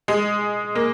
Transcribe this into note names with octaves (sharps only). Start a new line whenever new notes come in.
G#3
A#3